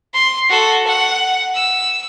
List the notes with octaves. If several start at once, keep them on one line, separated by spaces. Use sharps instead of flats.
C6
F#4 A4
F#5
E6